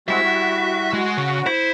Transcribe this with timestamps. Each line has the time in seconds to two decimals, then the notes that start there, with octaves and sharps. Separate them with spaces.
0.08 G3 G#3 C4 E4 F#4 E5
0.23 F#4
0.93 G#3
1.17 C#3
1.46 E4 C5